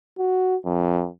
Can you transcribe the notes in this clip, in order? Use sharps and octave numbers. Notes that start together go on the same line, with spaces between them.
F#4
F2